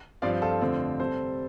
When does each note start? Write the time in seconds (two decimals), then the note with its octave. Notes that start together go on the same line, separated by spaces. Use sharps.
0.22 G2 F3 C4 D5 F5
0.41 F4 A4
0.61 F2 D3 F3 A3 C4
0.99 C3 G3 C4 A4 C5